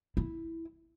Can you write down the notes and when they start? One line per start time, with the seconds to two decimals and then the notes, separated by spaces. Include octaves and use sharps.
0.17 E4